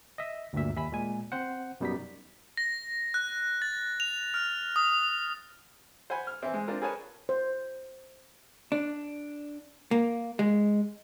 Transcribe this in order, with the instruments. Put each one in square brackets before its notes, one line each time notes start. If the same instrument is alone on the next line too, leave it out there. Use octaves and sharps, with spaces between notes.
[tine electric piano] D#5 E5
D2 G2 A#2 E5
D#2 E5 G#5 B5 B6
A#2 G#3 G#5
C4 C5 F#5
F#2 B2 G3 B3 D#4 B6
[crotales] A#6
F#6
A6
F7
F6
D#6
[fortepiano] C5 F#5 G#5 B5
F6
E3 C4 E4
G#3
C4 D4 F4 A#4
G#4 A#4 B4 C#5 G#5 A5
[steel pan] C5
[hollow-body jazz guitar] D4
A#3
G#3